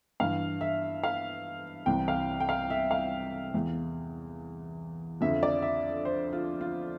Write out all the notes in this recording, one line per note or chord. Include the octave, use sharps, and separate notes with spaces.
G2 E3 F5
E5
F5
C2 C3 E3 G5
F5
G5
F5
E5
F5
E2 E3
F2 D3 F3 E5
D5
E5
C5
F4
F4